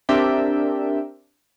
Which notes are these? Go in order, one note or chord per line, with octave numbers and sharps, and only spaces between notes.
C4 D4 G4 A#4 E5 G5